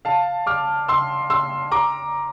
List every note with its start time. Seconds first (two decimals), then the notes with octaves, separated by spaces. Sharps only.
0.05 F5 A5
0.47 D6 F6
0.88 C6 E6
1.30 C6 E6
1.72 A#5 D6